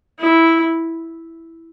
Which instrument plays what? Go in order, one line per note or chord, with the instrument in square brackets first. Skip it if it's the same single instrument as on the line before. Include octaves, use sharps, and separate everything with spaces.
[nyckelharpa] E4